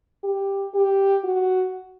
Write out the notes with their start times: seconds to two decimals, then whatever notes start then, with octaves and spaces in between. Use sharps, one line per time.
0.24 G4
0.74 G4
1.24 F#4